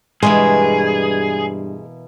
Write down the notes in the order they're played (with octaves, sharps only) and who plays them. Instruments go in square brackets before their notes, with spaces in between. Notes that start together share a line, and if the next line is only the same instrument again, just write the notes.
[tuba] G2 [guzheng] B2 E3 A#3 [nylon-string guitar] G#3 [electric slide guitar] G#4